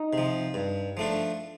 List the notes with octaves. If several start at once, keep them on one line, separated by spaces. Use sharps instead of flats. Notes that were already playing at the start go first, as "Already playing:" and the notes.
Already playing: D#4
C3 F3
G2
F3 A3 D4